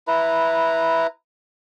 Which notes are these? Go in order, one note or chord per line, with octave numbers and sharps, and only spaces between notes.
E4 B4 A#5